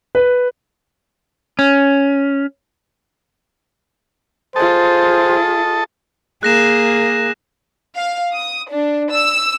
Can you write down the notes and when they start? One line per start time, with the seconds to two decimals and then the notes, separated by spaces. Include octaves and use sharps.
0.15 B4
1.59 C#4
4.56 F4 G#4 A4 C5 D#5 A5
6.43 A#3 G#4 F#6 A#6 E7
7.95 F5
8.33 D#6
8.70 D4
9.11 E6